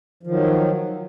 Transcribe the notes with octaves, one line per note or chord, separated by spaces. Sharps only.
D#3 F3 F#3